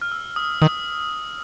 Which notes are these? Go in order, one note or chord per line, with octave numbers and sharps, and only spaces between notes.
F6
E6
D#6
D#3 D#6